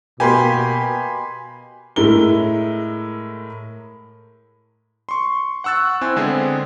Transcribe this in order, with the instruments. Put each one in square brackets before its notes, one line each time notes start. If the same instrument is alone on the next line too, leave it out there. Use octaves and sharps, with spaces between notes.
[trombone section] B2 [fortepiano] A#3 B3 G4 [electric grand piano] G#5 B5 C6
[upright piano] A2 G#3 E4 A#4 G7
[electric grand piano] C6 C#6
F#5 C#6 E6 F#6 A6
C4 E4 F#5 G#5 E6
D3 G#3 B3 C4 G#4